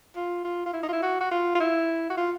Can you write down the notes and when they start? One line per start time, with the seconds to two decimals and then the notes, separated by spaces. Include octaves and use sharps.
0.16 F4
0.45 F4
0.66 F4
0.73 E4
0.83 D#4
0.89 F4
0.93 E4
1.02 F#4
1.21 F#4
1.31 F4
1.55 F4
1.60 E4
2.10 F#4
2.17 F4